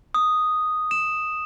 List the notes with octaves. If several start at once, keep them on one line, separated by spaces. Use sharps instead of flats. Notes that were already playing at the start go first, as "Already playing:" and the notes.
D#6
E7